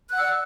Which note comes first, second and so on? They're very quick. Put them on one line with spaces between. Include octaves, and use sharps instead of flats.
F#6 F#5 E6 D5